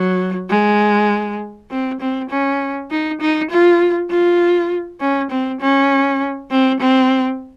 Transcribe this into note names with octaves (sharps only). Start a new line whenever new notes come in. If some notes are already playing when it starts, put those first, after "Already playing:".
Already playing: F#3
G#3
C4
C4
C#4
D#4
D#4
F4
F4
C#4
C4
C#4
C4
C4